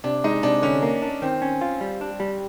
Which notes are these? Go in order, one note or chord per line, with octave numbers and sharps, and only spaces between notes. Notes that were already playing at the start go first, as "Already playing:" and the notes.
C3 D4
G#3 D#4
C3 D4
D3 C#4
A#3
D4
D#3 C4
C#4
F4
G3
D4
G3